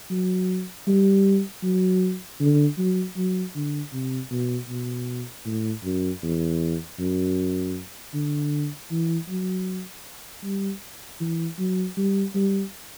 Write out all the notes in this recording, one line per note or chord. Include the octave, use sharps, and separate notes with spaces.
F#3
G3
F#3
D3
F#3
F#3
D3
C3
B2
B2
A2
F#2
E2
F#2
D3
E3
F#3
G3
E3
F#3
G3
G3